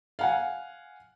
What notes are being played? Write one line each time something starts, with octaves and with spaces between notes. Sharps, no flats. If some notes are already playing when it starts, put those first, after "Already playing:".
F5 F#5 G#5